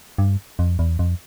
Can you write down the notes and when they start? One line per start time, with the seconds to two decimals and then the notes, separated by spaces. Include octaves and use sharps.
0.18 G2
0.59 F2
0.79 E2
0.99 F2